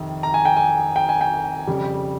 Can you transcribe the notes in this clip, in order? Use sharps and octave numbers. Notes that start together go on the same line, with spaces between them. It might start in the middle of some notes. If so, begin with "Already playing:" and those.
Already playing: F2 C3 D#3
A#5
G#5
G5
G#5
G5
G#5
G5
F2 C#3 G3